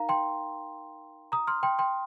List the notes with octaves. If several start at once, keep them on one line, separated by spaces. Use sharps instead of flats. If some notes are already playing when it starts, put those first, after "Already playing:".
Already playing: D#4 A#4 F5 A#5
G5 C6
A#5 D#6
C6 F6
G5 C6
G5 C6